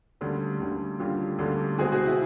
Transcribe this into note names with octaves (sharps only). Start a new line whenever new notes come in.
D2 D3 G3 A#3 C#4
D2 D3 G3 A#3 C#4
D2 D3 G3 A#3 C#4 F4 G4
D2 D3 G3 A#3 C#4
C#2 B2 G#3 C4 F#4 G#4
F#4 G#4
E4